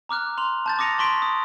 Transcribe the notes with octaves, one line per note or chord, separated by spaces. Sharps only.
A#5 D6 F6 F#6
C6 F7
A5 G6 A6
D6 D#6 A#6 C#7 D#7 F7
A5 C6 C#6 B6 D7
D#6